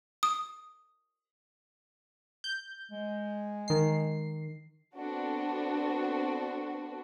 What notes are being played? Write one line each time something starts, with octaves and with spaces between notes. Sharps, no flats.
D#6
G6
G#3
D#3 C7
B3 C4 D4 F#4 A4